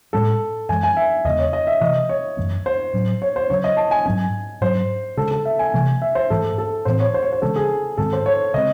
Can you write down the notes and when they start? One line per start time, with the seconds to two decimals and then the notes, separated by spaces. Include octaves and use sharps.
0.13 A2 G#3 C#4 A4
0.69 F#2 E3 G#3 G#5
0.83 G#5
0.97 E5
1.25 E2 C#3 G#3 D#5
1.39 C#5
1.53 D#5
1.67 E5
1.81 C3 E3 A3 D#5
2.09 C#5
2.37 F#2 E3 A3 C#4
2.66 C5
2.93 A2 F#3 C#4
3.22 C#5
3.36 C5
3.50 C#3 F#3 C#4 C#5
3.64 D#5
3.77 A5
3.91 G#5
4.06 G#2 F#3 C#4 G#5
4.61 G#2 F#3 C#4 C5
5.17 C#3 G#3 C#4 A4
5.31 A4
5.45 E5
5.59 G#5
5.74 C3 E3 A3
6.02 E5
6.15 C5
6.30 G#2 E3 A3 A4
6.58 A4
6.85 A2 E3 C4 C5
7.00 C#5
7.14 C5
7.23 C#5
7.33 C5
7.42 C#3 E3 G#3 C#4 A4
7.56 G#4
7.98 G#2 D#3 G#3 C4 A4
8.13 C5
8.26 C#5
8.54 C#3 G#3 C4 D#5